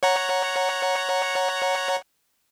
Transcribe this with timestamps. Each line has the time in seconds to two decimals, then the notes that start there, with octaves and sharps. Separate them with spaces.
0.03 C#5 F#5 A#5